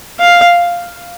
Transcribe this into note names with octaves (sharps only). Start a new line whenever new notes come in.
F5